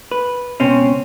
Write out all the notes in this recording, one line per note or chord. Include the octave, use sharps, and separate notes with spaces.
B4
C#2 B2 C4 C#4